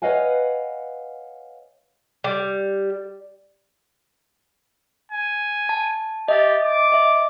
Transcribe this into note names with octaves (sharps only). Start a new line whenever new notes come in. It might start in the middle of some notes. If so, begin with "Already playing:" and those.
B4 C#5 D#5 F5 F#5 G#5
G3
G#5
A5
G4 D#5 E5 A6
D6
D#5 E5